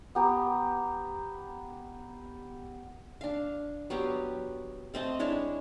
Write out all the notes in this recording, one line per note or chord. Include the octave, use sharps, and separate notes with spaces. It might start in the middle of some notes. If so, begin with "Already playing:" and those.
B3 G4 A#5
D4 F5
F#3 B3 G4 F5
A3 C4 D#5 A5
G#3 D4 E4 C#5